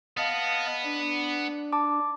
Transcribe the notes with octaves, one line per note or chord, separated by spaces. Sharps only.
B3 D#5 F5 A5
D4
A5 D6